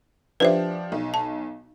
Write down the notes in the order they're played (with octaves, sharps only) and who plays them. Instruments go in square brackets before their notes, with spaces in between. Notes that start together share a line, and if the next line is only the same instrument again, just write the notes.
[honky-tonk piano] F3 D4 G4 [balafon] B4 C5 E5
[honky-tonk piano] B1
[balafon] A5